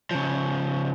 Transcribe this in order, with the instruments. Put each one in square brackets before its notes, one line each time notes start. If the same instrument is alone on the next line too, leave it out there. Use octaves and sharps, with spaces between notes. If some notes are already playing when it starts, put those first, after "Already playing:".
[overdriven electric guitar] C#3 F3